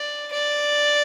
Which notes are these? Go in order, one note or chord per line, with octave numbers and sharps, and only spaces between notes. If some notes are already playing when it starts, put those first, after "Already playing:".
Already playing: D5
D5